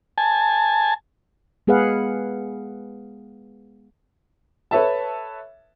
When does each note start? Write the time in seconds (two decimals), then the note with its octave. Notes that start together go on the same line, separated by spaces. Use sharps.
0.18 G#5 A5
1.67 G#3 B3 G#4 B4 F5 F#5
4.71 A4 B4 C#5 E5 A5